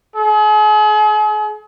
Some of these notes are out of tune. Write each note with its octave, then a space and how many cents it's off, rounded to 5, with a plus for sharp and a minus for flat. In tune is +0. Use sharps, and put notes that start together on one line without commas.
G#4 +40